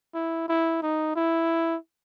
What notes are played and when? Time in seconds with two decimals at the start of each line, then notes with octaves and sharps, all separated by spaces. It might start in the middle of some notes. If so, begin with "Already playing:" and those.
0.15 E4
0.49 E4
0.83 D#4
1.16 E4